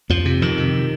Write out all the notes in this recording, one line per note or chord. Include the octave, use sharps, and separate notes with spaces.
F2 F3
C3
F2 D#3
C3